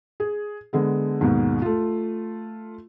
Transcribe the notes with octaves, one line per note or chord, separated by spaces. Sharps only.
G#4
D3 G#3 B3
D#2 G#2 B2
A3 F4